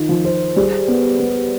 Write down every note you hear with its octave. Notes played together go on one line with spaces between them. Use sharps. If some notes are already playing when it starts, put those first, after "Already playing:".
Already playing: D#3 F4
F3
C5
G3 G#4
B3
B3